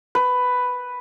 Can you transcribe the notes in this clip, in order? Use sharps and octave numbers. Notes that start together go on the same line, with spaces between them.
B4